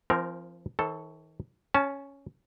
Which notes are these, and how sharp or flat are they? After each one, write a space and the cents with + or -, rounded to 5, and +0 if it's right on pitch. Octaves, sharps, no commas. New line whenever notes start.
F3 -30 C4 +10 A#4 +0
D#3 +40 A4 +0 C5 +40
C#4 +0 A5 -30